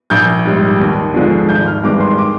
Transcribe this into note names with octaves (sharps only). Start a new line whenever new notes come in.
A#1 G6
G#2 G3
D#2
D3 F3 G#3 D4
G#1 G6
F6
G2 D#3 G#3 D6
C6
D6